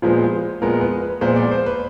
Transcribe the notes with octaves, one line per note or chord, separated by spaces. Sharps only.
A#2 F3 G#3 B3 C5
A#2 F3 G#3 B3 A#4
B4
B4
A#2 F3 G#3 B3 C5
D5
C5
B4